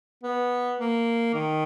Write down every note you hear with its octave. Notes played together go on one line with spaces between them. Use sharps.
B3
A#3
D#3